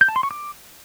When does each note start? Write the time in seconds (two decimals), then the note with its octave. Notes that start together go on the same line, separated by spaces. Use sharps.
0.01 G6
0.08 A5
0.16 C6
0.23 C#6
0.31 D6